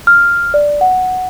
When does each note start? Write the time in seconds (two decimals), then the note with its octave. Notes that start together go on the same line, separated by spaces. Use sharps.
0.07 F6
0.54 D5
0.81 F#5